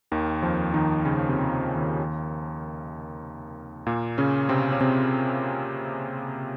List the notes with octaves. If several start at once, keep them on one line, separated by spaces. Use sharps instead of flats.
D#2 D#3
F2 F3
D#3 D#4
C#3 C#4
C3 C4
D#2 D#3
A#2 A#3
C#3 C#4
C3 C4
C#4
C3 C4